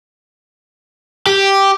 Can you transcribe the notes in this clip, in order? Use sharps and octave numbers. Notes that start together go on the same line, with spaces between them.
G4